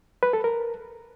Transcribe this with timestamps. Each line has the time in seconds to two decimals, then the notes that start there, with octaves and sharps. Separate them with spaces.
0.23 B4
0.33 A4
0.44 A#4